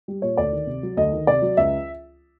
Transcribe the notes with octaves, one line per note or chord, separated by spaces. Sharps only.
G3
A#2 C#5
D2 D5
D#3
C3
F#3
D2 D#5
D#3
C3 D5
F#3
C#2 E5